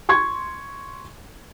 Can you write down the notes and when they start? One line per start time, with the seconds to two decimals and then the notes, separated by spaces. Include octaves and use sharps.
0.09 C6 C#6 G#6